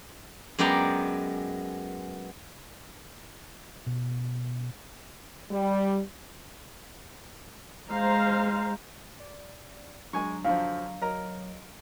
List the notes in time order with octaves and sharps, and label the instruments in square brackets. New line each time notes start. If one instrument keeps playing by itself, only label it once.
[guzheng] F#2 G#3 B3 D5 G5 A#5
[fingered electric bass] B2
[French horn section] G3
[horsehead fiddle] G#3 [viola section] C5 F5 A#5
[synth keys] D5
[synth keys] F#3 D4 A#5 [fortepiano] G#3 G#5 C#6
[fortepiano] F#2 D3 F3 [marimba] F5
[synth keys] F#3 C#5 D#5 [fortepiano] A#4 A#5